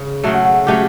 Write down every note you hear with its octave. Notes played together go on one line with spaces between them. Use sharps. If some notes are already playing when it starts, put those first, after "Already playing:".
Already playing: C#3
C#3 F#3 A3 E5
F#5
F#5
F#3 A3 C#4 G4